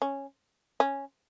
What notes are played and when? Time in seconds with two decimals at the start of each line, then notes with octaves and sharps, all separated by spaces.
0.02 C#4
0.80 C#4